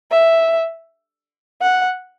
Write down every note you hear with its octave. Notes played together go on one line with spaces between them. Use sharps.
E5
F#5